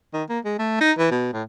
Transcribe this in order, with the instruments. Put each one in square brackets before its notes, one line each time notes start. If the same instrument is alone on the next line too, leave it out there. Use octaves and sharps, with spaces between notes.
[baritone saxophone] D#3
A#3
G#3
A3
D#4
E3
B2
A2